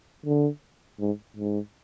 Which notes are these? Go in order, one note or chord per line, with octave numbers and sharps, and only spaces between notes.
D3
G#2
G#2